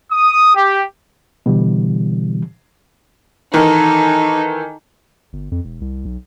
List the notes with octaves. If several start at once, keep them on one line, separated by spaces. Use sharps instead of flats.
D#6
G4
B2 D3 E3 G3
D#3 E3 D#4 A4
G1
F2
E1
C2
B1